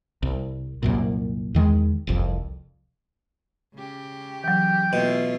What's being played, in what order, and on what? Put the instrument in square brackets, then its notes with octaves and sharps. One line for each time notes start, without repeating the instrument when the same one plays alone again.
[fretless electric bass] C2
C2 F#2 A#2
E2 D#3 G#3
F1 C2 F2
[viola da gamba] C#3 G4
[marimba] E3 F#3 [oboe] G5
[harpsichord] B2 [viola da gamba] A3 E4 F4